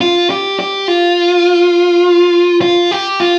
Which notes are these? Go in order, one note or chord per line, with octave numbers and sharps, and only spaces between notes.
F4
G4
G4
F4
F4
G4
F4